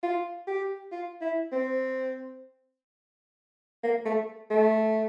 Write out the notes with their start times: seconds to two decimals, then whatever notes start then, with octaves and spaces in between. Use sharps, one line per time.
0.03 F4
0.47 G4
0.92 F4
1.21 E4
1.52 C4
3.83 A#3
4.05 A3
4.51 A3